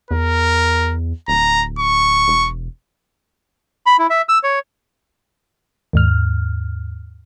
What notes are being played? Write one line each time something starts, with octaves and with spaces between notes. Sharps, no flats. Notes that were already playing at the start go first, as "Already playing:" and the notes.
E2 A#4
D1 A#5
C#6
E1
B5
E4
E5
E6
C#5
D#2 G#2 F6